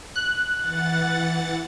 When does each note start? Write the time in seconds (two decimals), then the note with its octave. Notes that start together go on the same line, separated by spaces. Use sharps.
0.16 F#6
0.59 E3 F#5 A6